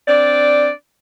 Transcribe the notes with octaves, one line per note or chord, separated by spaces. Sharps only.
C4 D4 D5